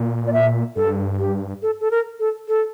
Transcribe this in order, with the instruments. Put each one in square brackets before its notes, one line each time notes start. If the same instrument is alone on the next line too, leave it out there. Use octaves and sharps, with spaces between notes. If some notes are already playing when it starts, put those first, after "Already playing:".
Already playing: [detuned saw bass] A#2
[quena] D5
E5
[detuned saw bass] G2 [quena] A4
[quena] G4
A4
A4
A#4
A4
A4